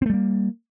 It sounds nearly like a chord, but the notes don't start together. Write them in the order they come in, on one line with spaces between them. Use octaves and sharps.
C4 A3 G3 A#3